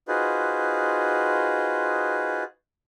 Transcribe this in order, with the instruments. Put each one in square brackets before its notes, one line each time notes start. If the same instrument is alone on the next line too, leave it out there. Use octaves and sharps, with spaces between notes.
[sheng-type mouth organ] D#4 F4 F#4 G#4 B4 C5